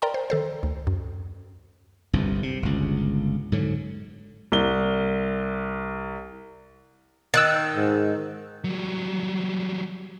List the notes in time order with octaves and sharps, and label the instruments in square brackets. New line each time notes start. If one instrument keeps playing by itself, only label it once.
[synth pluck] A#4 D5 G5 A#5 C6
C5
D#3 A4 C5
D2
F#2
[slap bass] G1 C2 G2
C3
G1 C#2
G#2 D3 F#3
[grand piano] C2 G7
[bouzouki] D#3 [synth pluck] E6 F#6 A6
[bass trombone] G#2
[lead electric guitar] F#3 G3